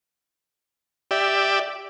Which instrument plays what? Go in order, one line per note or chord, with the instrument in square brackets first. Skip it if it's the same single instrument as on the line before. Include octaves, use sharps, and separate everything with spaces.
[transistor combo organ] G4 D5 E5